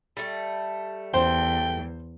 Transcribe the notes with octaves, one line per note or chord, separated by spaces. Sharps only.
G3 A3
E2 C5 G5